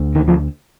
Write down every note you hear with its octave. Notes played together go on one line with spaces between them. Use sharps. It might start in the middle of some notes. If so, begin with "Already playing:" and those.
Already playing: D2 D3
D#3
F3